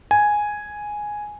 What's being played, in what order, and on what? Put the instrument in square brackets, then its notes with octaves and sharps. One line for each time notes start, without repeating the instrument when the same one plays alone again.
[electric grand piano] G#5